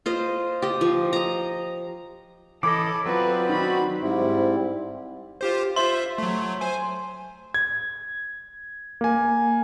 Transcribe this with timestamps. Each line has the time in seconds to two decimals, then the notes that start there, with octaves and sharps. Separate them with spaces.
0.06 F4 C5 D#5
0.62 G4 D#5
0.81 F3
1.13 D#5 A#5
2.63 E3 A4 C#5 D#5 B5 D6
3.06 F#3 B3 C4 F4 B4 D5
3.49 D#3 F#4 B5
4.00 G#2 G3 C4 E4
5.41 F4 G4 C5
5.76 F4 C5 E5 C6
6.18 F#3 A3
6.61 C5 G#5
7.54 G#6
9.01 A#3 G#5